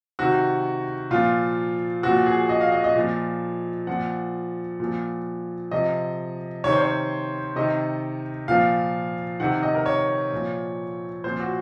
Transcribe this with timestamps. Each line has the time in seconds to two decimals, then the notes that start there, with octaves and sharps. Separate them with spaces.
0.19 C3 D#3 F#4
1.11 A#2 F3 F4
2.03 A#2 F3 F#4
2.26 G#4
2.49 D#5
2.61 F5
2.72 D#5
2.84 D#5
2.95 A#2 F3
3.87 A#2 F3 F#5
4.80 A#2 F3
5.71 C3 F3 D#5
6.64 C3 D#3 C#5
6.72 C5
6.82 C#5
7.56 C3 D#3 D#5
8.48 A#2 F3 F5
9.40 C3 D#3 F#5
9.63 D#5
9.75 A#4
9.86 C#5
10.32 A#2 F3
11.24 A#2 F3 C5
11.40 F#4